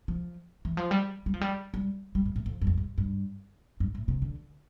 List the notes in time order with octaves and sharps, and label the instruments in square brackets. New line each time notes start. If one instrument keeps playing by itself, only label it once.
[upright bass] F3
E3
F3
G3
G3
F3
G3
G3
G3
A2
A2
F2
G2
F2
G2
G2
G2
A2
C3
D3